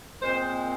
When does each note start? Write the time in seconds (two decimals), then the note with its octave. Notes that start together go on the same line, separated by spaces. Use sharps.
0.22 A#2 G#3 C4 C5